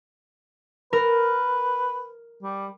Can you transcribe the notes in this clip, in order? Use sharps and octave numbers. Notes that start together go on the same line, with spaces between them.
A#4 B4
G3